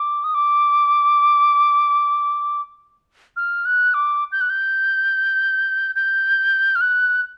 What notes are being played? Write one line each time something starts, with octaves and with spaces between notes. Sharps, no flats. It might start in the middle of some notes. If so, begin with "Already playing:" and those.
Already playing: D6
D#6
D6
F6
F#6
D6
G6
F#6
G6
G6
F6
F#6